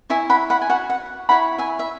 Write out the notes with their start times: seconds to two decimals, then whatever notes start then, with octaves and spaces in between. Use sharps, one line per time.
0.10 E4 C#5 E5 G#5
0.30 F#5 B5
0.50 F#5 B5
0.62 G#5
0.69 F#4 C#5 F#5
0.90 F#5
1.29 E4 C#5 F#5 B5
1.58 E5 G#5
1.79 E5